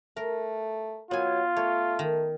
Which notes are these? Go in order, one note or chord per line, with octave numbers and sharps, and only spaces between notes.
A3 A#4
F#3 B3 F4 G#5
A3 C#5
D#3